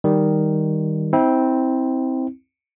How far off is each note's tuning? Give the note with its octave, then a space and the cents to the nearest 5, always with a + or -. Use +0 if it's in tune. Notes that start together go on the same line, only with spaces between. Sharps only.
D#3 +0 G3 +0
C4 +0 E4 -35